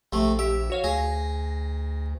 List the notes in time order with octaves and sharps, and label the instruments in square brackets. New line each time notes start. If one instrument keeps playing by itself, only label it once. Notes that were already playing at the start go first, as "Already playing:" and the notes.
[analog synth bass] A#1 [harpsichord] C3 A3
[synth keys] G4 [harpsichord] E5
[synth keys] F#4 C#5 F5
[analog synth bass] D2 [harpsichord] G#4 [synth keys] A#6